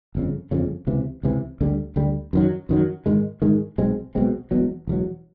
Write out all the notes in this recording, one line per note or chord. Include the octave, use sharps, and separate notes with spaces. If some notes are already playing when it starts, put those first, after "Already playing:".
G1 F2 C#3
G1 F2 C#3
C#2 C3 E3
C#2 C3 E3
D2 D3 G3
D2 D3 G3
F#2 D#3 F#3
F#2 D#3 F#3
G#2 D#3 G#3
G#2 D#3 G#3
B1 B2 G#3 C4
B1 B2 G#3 C4
E1 E2 B2 F#3
E1 E2 B2 F#3